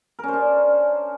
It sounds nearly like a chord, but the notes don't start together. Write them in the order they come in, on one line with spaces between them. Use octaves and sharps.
A#4 C#4 C5 D4